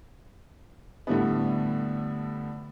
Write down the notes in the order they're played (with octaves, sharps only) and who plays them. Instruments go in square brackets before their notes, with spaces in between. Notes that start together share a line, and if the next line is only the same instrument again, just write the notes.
[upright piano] A2 D3 G3 A3 B3